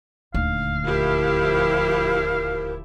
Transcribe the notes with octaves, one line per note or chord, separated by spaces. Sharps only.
D#1 D2 F5
F3 E4 G4 A#4